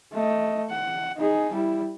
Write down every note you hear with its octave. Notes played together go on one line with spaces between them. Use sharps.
A3 D#5
F#5
D#4 G#4
G3 E4